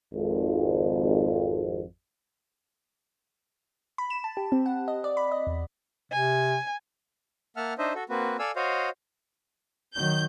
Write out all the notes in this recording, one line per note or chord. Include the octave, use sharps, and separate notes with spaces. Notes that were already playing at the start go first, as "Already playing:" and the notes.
G#1 F2
B5
E7
A5
G4
C4
F#5
D#5
D5
B5
D#5
E2
C3 G#5
A#3 E5 F#5 A5 F6
D4 D#4 C5 D#5 E5
F#4 A4
A#3 C4 F#4 B4
A4 D5 F5 G#5 E6
F#4 C5 C#5 D#5 F5
D#3 F#3 G6